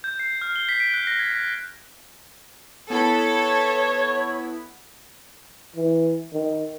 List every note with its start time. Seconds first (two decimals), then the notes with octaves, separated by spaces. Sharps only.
0.04 G6
0.19 C7
0.42 F6
0.56 G7
0.69 B6
0.80 D7
0.94 F#6
1.07 A#6
1.19 G#6
1.32 B6
2.90 B3 E4 A4 C#5 B5
5.76 E3
6.33 D#3